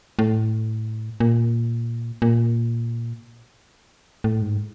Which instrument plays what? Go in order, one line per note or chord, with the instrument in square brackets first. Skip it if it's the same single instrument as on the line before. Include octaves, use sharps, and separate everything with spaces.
[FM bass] A2
A#2
A#2
A2
G#2